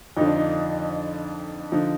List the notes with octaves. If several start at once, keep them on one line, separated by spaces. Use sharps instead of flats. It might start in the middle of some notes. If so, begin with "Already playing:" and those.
F2 D3 F3 D#4
D4
D#4
D3 F3 D#4